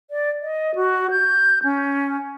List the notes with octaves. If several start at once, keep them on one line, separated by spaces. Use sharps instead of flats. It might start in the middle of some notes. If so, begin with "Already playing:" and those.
D5
D#5
F#4
G6
C#4